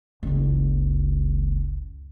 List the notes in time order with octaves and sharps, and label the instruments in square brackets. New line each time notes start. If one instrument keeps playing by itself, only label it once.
[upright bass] F#1 C#2